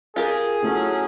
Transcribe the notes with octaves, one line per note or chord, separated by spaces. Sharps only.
F4 G4 G#4 A#4
F#3 A3 C#4 E4